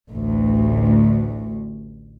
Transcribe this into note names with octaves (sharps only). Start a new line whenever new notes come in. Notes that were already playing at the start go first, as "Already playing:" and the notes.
A1 D2